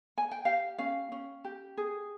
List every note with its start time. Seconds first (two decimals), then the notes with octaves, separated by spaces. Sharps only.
0.18 G#5
0.31 G5
0.45 G4 F5
0.78 C#4 F5
1.12 C#4
1.44 G4
1.77 G#4